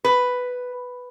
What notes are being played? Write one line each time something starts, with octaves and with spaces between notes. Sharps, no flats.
B4